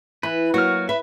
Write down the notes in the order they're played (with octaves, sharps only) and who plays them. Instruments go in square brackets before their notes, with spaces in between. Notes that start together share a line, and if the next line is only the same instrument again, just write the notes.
[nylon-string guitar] E3 [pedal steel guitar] B4
[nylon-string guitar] F#3 A#3 [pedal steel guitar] F#4 F6
[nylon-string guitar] B4 [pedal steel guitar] E5